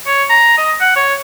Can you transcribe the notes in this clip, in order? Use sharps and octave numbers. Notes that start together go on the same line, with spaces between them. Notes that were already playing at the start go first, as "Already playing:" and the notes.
C#5
A#5
D#5
F#5
C#5